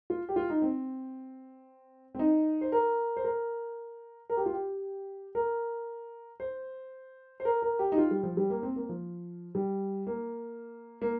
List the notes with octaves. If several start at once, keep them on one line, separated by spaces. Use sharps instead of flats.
F4
G4
F4
D#4
C4
C4
D#4
C5
A#4
C5
A#4
A#4
G4
F4
G4
A#4
C5
C5
A#4
A#4
G4
D#4
F4
G3
F3
G3
A#3
C4
A#3
F3
G3
A#3
A#3